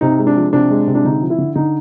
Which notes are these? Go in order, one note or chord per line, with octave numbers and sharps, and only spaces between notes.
C3 D#4
G#3
D4
F3
C3 D4
G#3
C3
D4
D3 D#4
F3
E4
D3
D3 D#4